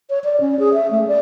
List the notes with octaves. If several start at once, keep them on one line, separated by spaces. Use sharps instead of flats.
C#5
D5
C#4
G#4
E5
A3
D5